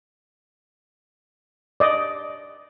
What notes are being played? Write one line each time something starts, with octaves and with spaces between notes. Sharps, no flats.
D5 D#5